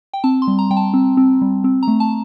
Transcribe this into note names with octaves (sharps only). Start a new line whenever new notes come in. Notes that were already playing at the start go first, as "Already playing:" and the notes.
G5
C4 A5
C6
G3
A#5
G3 G5
A5
C4
C4
G3
C4
A#5
A3
A5